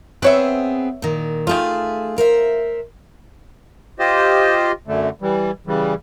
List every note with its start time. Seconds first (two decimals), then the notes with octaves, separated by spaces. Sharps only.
0.22 B3 C4 G#4 B4 C#5 E5
1.02 A#2 D#3
1.47 D#3 A3 F4 G#4
2.18 A#4 C5 E5
3.99 F4 G4 C5 D#5
4.87 F#2 D3 A3
5.22 E3 G3
5.67 C#3 E3 G3